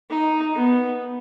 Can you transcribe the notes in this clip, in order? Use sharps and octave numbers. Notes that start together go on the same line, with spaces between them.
D#4
B3